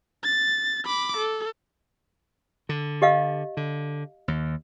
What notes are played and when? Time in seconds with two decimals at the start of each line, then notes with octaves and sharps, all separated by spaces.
0.24 A6
0.86 B5 D6
1.17 A4
2.69 D3
3.02 G4 D#5 F5
3.57 D3
4.28 D#2